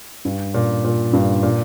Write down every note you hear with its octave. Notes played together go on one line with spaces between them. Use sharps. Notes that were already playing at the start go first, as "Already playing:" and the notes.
G2
A#2
A#2
G2
A#2